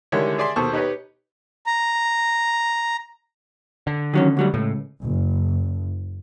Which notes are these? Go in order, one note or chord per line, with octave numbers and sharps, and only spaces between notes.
D3 D#3 G3 G#3 E4 C#5
G#4 D5 E5 C6
D#2 B2 A4 C5 C#6
D#4 G4 B4 C#5 D#5
A#5
D3
D#3 F#3 C#4
D2 F#3 G3
C#2 A2
F#1